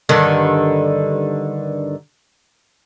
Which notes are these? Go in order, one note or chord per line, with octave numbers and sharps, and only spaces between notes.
G2 D3 D#3